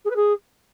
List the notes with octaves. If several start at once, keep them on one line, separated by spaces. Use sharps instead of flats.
G#4
B4
G#4